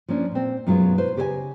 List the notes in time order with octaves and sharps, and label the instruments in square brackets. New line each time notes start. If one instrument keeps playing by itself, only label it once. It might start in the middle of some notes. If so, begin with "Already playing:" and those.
[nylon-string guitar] F3 A#3 C#4 D4
A#2 C4
F#2 B2 F#3 G#3 B3 F4
E4 B4 C5
C#3 G4 B4 C5 D#5 G#5